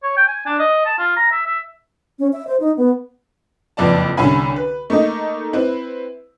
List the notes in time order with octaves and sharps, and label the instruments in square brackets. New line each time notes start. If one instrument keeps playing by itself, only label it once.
[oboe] C#5
G5
G#5
D4
D#5
A5
F4
A#5
E5
E5
[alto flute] C#4
E5
C5
D#4
B3
[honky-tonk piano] F#1 F2 B4 D5 A5
C2 D3 C#4 E5 G#5 B5
B4
A3 A#3 D#4 D#5
C4 E4 B4